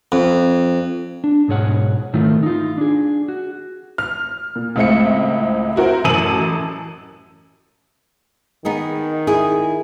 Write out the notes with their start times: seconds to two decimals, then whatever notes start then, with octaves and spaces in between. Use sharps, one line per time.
0.12 F2
1.24 D4
1.48 B1 G#2 G#4 C#5 F#5
2.13 G#2 D#3 A3 E4 F4
2.43 D#4 F4
2.78 D4 G#4
3.28 F#4
3.98 F6
4.56 A#2
4.76 C#2 A2 G#3 C4 E5 C#7
5.76 E4 F#4 A#4 C5
6.04 A1 F#2 A5 E6 D#7 F#7
8.65 D#3 B3 D#4 G#4
9.27 E4 G#4